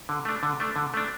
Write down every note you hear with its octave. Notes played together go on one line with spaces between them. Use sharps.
D3
A3 D4
D3
A3 D4
D3
A3 D4